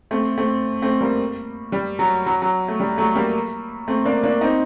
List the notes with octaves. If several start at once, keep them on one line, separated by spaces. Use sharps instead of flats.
A3 C4
A3 C4
A3 C4
G3 A#3
G3
F#3
F#3
F#3
A3
G3
F#3 A3
G3 A#3
A3 C4
A#3 D4
A#3 D4
C4 D#4